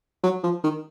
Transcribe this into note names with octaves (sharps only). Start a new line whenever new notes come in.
F#3
F3
D#3